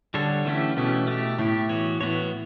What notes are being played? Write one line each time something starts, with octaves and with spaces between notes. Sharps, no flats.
D3 G3 D4 A4 C#5
E3 A3 C#4 E4 G4
B2 E3 A3 C#4 E4 G4
A3 E4 G4
A2 A3 E4 G4
E3 B3 F#4 C#5
A2 E3 B3 F#4 C#5